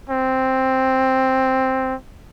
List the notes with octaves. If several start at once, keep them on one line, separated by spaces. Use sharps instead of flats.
C4